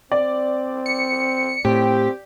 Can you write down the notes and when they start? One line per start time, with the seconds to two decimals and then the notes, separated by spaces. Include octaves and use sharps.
0.12 C4 D5
0.86 C#7
1.65 A2 C4 G4